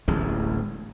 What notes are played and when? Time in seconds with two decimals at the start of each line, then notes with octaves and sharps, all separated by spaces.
0.08 D1 A1 E2 G#3